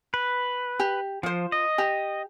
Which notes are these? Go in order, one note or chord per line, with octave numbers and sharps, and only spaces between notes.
B4
G4
F3 F4 C5
D#5
G4